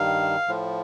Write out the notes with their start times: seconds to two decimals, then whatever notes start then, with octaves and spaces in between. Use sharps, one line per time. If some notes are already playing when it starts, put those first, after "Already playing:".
Already playing: G2 D#3 F5
0.48 A2 F3